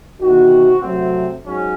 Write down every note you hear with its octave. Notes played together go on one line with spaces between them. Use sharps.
E2 C3 D#3 F#4
C3 F#3 A3 C4
G#2 F#3 C#4